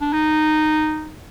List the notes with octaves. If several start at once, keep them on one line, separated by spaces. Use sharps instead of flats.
D4
D#4